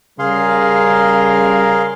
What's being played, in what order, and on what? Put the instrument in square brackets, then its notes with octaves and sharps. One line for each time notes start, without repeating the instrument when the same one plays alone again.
[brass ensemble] C#3 G3 A#4 [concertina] G#4 F5 C6